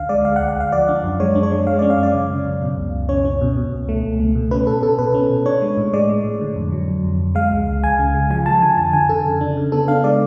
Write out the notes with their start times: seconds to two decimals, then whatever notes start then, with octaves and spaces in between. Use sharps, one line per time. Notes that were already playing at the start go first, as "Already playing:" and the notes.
Already playing: D2 D3 F5
0.09 G#3 D5
0.25 D2 F5
0.36 F#5
0.40 D2
0.48 F#5
0.56 D2 F5
0.72 F3 D5
0.89 D4
1.04 F#2
1.20 G#3 C#5
1.35 D4
1.43 C#5
1.52 G#3
1.66 G#3 F5
1.79 D5
1.82 C#4
1.90 F5
1.98 F#2 D5
2.15 C#3
2.30 C#3
2.45 F#2
2.62 B2
2.78 C#2
2.93 C#2
3.09 C#4 C#5
3.25 C#4
3.41 B2
3.57 B2
3.72 C#2
3.89 A3
4.04 C#2
4.20 A3
4.35 B2
4.51 C#4 B4
4.67 B2 A4
4.82 B2 A4
4.99 B2 B4
5.14 C#4
5.30 B2
5.46 D4 C#5
5.62 G#3
5.77 A2
5.93 G#3 D5
6.09 G#3
6.24 A2
6.41 D3
6.56 F2
6.72 F#3
6.88 F2
7.04 F2
7.20 F2
7.35 G#3 F5
7.51 C#2
7.67 C#2
7.83 C#2 G#5
7.99 C#3
8.14 G#3
8.30 F3 G#5
8.46 F3 A5
8.62 D3 G#5
8.78 F2 A5
8.93 D3 G#5
9.09 D3 A4
9.25 C#3
9.41 D4
9.57 C#3
9.72 B3 A4
9.88 D4 F5
10.04 G#3 D5